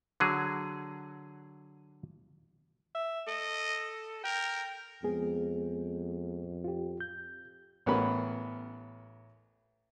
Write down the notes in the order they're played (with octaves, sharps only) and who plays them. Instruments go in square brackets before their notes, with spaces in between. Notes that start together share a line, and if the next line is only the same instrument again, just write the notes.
[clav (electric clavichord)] D3 F#3 G#4
[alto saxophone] E5
[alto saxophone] A4 [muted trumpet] D#5
[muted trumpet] A#4 [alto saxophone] G5
[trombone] F2 [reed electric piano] G#3 B3 G#4
[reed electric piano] F4 G4
G6
[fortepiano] A1 B3 C#4 A#4 B5